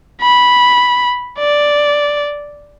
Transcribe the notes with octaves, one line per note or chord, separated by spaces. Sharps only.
B5
D5